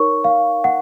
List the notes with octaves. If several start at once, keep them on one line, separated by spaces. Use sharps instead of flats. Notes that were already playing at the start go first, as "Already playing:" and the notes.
Already playing: D#4 A#4 C#5 C#6
F5
F#5